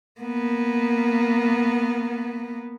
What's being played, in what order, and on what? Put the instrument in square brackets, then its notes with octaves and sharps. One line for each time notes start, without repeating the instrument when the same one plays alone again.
[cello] A#3 B3